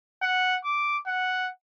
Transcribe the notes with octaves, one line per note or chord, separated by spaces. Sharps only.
F#5
D6
F#5